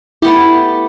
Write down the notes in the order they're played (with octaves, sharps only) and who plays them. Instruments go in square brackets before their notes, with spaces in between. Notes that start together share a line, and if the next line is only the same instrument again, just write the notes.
[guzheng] A3 B3 G4 [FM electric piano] E4